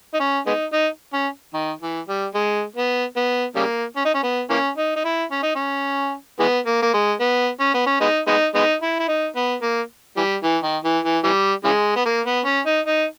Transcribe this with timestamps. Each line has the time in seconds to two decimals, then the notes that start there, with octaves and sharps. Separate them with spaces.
0.14 D#4
0.20 C#4
0.46 G#3 B3 D#4
0.73 D#4
1.13 C#4
1.53 D#3
1.81 E3
2.08 G3
2.34 G#3
2.76 B3
3.16 B3
3.56 C#3 G3 A#3
3.96 C#4
4.05 D#4
4.14 C#4
4.23 B3
4.50 E3 A#3 C#4
4.77 D#4
4.96 D#4
5.04 E4
5.31 C#4
5.43 D#4
5.55 C#4
6.39 E3 G#3 B3
6.66 A#3
6.82 A#3
6.94 G#3
7.20 B3
7.60 C#4
7.74 B3
7.86 C#4
8.01 G#3 B3 D#4
8.27 G#3 B3 D#4
8.55 G#3 B3 D#4
8.82 E4
8.99 E4
9.08 D#4
9.36 B3
9.62 A#3
10.17 E3 G3
10.43 E3
10.63 D#3
10.84 E3
11.04 E3
11.24 E3 G3
11.64 C#3 E3 G#3
11.96 B3
12.06 A#3
12.26 B3
12.45 C#4
12.66 D#4
12.86 D#4